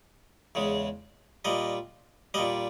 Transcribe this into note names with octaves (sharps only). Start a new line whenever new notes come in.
E2 C#3 G#3
A#2 G3 D#5
A#2 G3 D#5